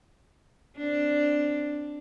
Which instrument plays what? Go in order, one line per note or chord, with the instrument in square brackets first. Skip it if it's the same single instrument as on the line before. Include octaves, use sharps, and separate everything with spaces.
[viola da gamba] C4 D4